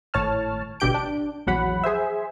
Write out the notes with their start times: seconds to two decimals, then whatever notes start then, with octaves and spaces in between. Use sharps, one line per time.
0.14 G#1 A2 C#5 A5 F6
0.80 G#1 B2 D3 G4 G6 D7
0.94 D4
1.47 A#1 E2 F#3 F#5 B5
1.84 G#4 C5 E5